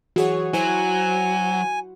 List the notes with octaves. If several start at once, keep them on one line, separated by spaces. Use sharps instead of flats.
E3 F#4 G#4 C#5
F#3 E4 C5 F#5 G#5